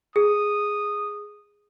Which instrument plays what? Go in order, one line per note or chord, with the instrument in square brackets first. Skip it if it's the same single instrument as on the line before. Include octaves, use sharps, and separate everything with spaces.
[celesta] G#4 [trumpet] D#6